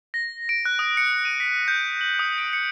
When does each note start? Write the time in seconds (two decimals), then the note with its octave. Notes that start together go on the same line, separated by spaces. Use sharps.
0.14 A#6
0.49 D7
0.65 F#6
0.79 D#6
0.97 C#7
1.25 D#7
1.40 B6
1.68 G6
2.01 F#7
2.19 D#6
2.38 D7
2.53 C#7